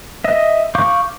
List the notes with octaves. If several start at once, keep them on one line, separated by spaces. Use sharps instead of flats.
D#5 E5
F5 C#6 D6 G6